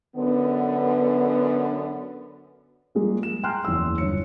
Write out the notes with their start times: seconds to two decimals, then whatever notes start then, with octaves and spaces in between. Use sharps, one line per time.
0.16 F#2 D3 B3
2.95 F3 G3 G#3 A#3
3.23 E7
3.43 G5 G#5 A#5 C6 F6 F#6
3.65 F#1 E2 C6 E6
3.98 G1 C#5 C#7